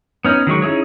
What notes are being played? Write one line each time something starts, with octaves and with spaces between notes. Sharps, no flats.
B3 C#4 D#4
D#3 F#3 G#3 C#6
C#4 D#4 E4 G#4 C#5